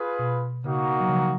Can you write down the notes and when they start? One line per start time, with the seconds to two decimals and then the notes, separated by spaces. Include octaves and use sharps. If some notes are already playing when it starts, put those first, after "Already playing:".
Already playing: F4 G#4 B4
0.19 B2
0.64 C#3 A#3 D#4 F#4
1.00 F#3
1.09 C#3 F3